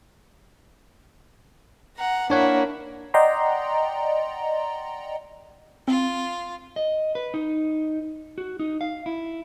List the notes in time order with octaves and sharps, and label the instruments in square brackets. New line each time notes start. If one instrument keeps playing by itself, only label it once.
[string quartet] F#5 A#5
[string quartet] A#3 E4 [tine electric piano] D4 C#5 F#5
[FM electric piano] D5 D#5 F#5 G5 A#5 C6
[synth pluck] C4 [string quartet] F4
[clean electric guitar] D#5
B4
D#4
F#4
D#4
F5
E4